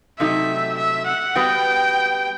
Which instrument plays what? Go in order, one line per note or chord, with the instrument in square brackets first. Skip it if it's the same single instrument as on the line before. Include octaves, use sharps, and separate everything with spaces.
[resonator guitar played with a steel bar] C3 F#3 A3 D#4 [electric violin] E5
[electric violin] E5
F#5
[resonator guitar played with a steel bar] G3 B3 F#4 [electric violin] G5